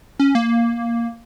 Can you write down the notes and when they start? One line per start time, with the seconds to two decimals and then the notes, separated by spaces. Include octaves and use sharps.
0.19 C#4
0.35 A#3